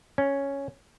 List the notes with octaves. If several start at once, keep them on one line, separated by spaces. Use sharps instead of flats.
C#4